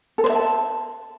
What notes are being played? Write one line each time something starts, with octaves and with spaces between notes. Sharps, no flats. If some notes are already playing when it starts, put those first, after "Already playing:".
A4
C5
E5
A5